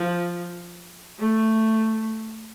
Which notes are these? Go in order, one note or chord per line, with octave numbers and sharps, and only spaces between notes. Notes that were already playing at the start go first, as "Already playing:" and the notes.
Already playing: F3
A3